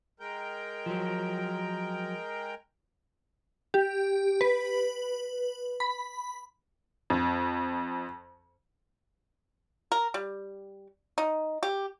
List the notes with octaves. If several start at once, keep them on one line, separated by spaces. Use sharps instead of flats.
G#3 A#4 G5
F3 F#3
G4
B4
B5
F2
A#4
G3
D#4
G4